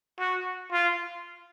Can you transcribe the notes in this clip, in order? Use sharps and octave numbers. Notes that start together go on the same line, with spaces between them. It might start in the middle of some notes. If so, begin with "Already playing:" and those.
F#4
F4